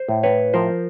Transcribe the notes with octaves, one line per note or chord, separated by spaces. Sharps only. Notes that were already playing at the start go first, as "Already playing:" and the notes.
Already playing: C5
A2
B4 C#5
F3 A#4 C5